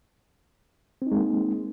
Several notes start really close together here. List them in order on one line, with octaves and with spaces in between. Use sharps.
C4 D#4 G#3 A#3